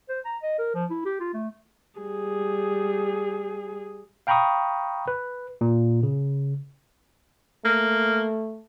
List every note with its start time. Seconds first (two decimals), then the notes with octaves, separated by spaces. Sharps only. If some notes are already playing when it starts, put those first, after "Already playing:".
0.09 C5
0.25 A#5
0.42 D#5
0.59 A#4
0.75 F3
0.90 E4
1.05 G4
1.20 F4
1.34 A3
2.00 G3 G#4
4.27 F5 G5 A#5 B5 C#6 D#6
5.08 B4
5.61 A#2
6.03 C#3
7.65 A3 A#3